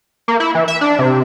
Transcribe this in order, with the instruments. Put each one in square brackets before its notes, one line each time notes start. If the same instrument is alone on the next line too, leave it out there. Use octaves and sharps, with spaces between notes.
[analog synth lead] A#3
E4
E3
E5
D4
C3